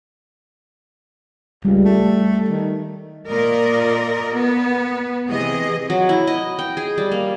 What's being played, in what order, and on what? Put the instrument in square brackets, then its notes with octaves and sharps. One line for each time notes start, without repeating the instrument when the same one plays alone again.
[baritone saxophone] C#2 [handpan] G3
[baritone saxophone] A3
D#3
[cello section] A#2 A#4 D5 D#5
B3
C3 E3 G#4 D#5
[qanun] F#3
E4
D#5
G5
G#4
G3
A#3